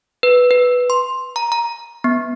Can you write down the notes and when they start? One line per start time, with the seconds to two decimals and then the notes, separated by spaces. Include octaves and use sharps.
0.23 B4
0.51 B4
0.90 C6
1.36 A#5
1.52 A#5
2.04 B3